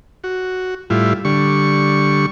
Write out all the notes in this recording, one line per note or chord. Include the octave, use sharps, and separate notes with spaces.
F#4
A2 G3 E4 F4
D3 G3 C#6